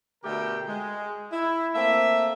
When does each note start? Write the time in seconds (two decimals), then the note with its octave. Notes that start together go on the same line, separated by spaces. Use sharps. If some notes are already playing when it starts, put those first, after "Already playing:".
0.24 B2 D3 A3 G4 A#4 G5
0.68 G#3
1.32 E4
1.74 A3 A#3 C4 E5